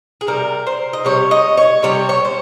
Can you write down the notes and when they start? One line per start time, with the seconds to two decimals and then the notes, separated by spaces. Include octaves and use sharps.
0.21 G#4
0.27 C3 G3 A#4
0.67 C5
0.93 D#5
1.05 C3 G3 C#5
1.31 D#5
1.57 C#5
1.83 C3 G3 C#5
2.09 C#5
2.25 C5